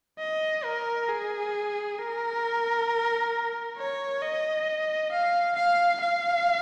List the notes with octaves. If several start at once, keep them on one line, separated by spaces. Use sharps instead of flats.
D#5
A#4
G#4
A#4
C#5
D#5
F5
F5
F5